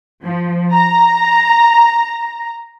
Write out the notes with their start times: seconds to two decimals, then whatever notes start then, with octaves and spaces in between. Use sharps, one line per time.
0.23 F3
0.72 A#5